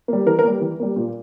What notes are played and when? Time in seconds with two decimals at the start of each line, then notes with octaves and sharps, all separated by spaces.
0.08 G3 A#3
0.26 E3 A#4
0.39 A#4
0.43 G3 A#3
0.61 E3
0.80 G3 A#3
0.96 A#2